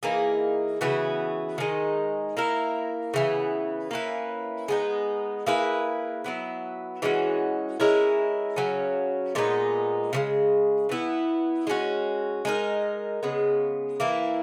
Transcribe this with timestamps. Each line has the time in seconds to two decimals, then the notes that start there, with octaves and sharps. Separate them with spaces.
0.03 E3 A#3 D#4 G#4
0.81 C#3 E3 B3 F#4
1.58 D#3 G#3 D#4
2.37 A#3 E4 A#4
3.14 C#3 E3 B3
3.91 A#3 C#4 E4 B4
4.68 G#3 B3 D#4
5.46 A#3 E4 G#4 B4
6.24 F#3 B3 E4 B4
7.02 E3 G#3 C#4 F#4
7.80 G#3 C#4 E4 A#4
8.56 C#3 F#3 C#4
9.35 A#2 G#3 B3 D#4
10.13 C#3 E3 G#3
10.89 E3 B3 E4
11.67 G#3 C#4 F#4
12.45 G#3 D#4 A#4
13.23 C#3 G#3 B3
14.00 E3 A#3 E4